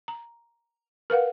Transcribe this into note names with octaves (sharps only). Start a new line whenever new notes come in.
A#5
A#4 B4 F5 F#5